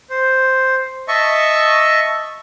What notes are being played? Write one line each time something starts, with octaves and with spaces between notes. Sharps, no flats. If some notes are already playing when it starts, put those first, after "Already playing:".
C5
D#5 E5 A5 C#6